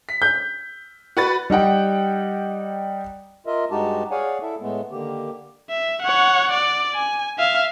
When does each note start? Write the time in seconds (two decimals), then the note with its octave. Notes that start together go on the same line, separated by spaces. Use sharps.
0.09 B6
0.22 G6
1.17 F#4 B4 A6
1.50 G3 D#4 F#5 G5
3.46 F4 A#4 D#5 E5
3.71 G2 G#3 D#4 F#4 G4 A5
4.11 G#4 C#5 D5 F5 F#5 G#5
4.42 E4 A4 E5
4.61 A2 G#3 A3 B3
4.92 D3 D#3 A#3 G4
5.70 E5
6.02 C#5 F#5
6.52 D5
6.94 G#5
7.38 E5 F5